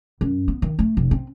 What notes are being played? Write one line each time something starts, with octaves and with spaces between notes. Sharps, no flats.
F#2
B3
D#3
A3
F1
C4